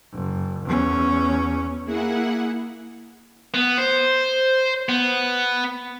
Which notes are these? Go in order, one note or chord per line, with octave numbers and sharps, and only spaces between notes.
F#1
E2 C#4
A#3 E4 G#4 F#5
B3
C5
B3